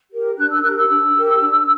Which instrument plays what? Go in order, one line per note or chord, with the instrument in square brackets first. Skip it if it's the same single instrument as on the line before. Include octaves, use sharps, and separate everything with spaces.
[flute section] G4 A#4
D4 F#6
E6
G4 A#4 F#6
E6
D4
G4 A#4
D4